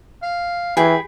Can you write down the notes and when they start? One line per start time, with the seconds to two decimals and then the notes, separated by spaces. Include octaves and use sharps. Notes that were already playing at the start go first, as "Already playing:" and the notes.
0.22 F5
0.77 E3 G#4 G5 B5